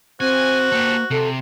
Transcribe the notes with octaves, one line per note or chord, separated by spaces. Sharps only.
C4 F#4 C5 G#5
A#3 G4 A4
C3 A4